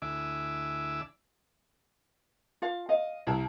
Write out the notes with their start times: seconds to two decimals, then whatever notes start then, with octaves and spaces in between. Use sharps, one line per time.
0.02 D2 D4 E4 E5 G#5 D6
2.62 F4 F5
2.89 D#5 F5
3.27 C2 E4 A5